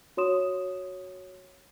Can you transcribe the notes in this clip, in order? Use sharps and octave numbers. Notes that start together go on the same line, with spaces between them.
F#4 C#5 C6 D#6 E7